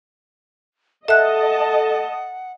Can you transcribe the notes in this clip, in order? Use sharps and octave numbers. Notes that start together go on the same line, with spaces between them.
A4 D#5 E5 F#5 A5 F#6